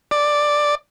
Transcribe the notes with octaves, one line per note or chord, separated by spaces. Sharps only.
D5